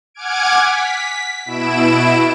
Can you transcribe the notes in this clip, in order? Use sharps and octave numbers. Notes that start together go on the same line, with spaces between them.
F#5 G#5 D6 F6 G#6 D7
B6
B2 E4 D7 E7